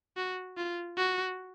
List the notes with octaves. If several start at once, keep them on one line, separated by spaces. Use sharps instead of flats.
F#4
F4
F#4